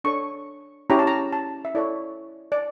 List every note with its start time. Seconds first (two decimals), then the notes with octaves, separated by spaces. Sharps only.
0.04 D4 A4 C#5 C#6
0.90 C#4 E4 G4 C#5 A#5
0.99 A5
1.07 A#5
1.33 A5
1.65 E5
1.75 E4 A4 C#5 D5
2.52 D5